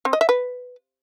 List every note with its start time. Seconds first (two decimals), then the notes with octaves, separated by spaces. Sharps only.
0.05 C4
0.13 D#5
0.21 E5
0.29 B4